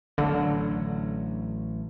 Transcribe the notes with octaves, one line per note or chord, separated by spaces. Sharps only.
A1 D3 F#3